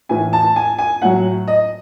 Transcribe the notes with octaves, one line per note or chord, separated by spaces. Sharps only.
A2 E3 G#5
A5
G#5
G#5
A2 F#3 F#5
D#5